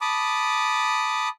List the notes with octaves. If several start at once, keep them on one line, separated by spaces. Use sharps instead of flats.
A5 B5 D6 D#6